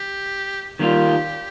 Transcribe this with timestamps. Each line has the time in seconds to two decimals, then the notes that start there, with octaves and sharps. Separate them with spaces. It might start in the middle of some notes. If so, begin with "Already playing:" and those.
Already playing: G4
0.79 D#3 G3 A#3 F4 G4